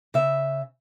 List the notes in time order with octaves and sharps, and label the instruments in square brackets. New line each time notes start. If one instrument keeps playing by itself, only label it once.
[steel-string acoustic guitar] C#3 E5